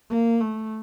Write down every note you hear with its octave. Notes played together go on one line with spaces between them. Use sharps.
A#3
A3